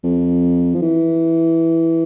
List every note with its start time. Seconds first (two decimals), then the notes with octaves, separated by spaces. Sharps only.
0.04 F2
0.75 F3
0.82 E3